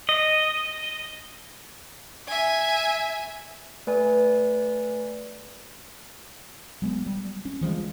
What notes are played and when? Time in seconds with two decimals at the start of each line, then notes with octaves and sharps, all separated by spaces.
0.09 D#5
2.27 E5 G#5
3.87 A3 B4 D5 G#5
6.82 F#3 G#3 B3
7.06 G3
7.45 C#4
7.61 E3 F3 G3 G#3